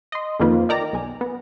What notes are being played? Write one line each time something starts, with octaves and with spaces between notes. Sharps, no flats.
D#5 C6
F2 D#3 A#3 F4 B4 C5
D#4 A#4 D5 G5 A#5
B1 G#5
B3